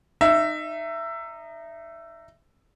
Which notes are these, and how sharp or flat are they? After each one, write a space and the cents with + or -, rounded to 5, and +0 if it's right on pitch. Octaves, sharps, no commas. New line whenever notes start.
D#4 -20 E5 +15